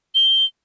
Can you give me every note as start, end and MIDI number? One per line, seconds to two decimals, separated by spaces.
0.15 0.45 103